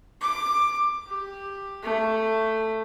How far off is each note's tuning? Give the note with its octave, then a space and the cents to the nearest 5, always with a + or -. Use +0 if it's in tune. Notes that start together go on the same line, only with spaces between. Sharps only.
D6 +15
G4 +10
A3 +10